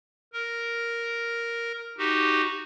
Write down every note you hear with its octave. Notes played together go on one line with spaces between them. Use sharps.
A#4
D#4 F#4 G4